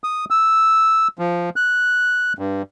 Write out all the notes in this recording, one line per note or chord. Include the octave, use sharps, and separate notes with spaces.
D#6
E6
F3
F#6
G2